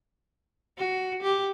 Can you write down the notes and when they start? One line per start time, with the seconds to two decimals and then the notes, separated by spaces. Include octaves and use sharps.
0.78 F#4
1.23 G4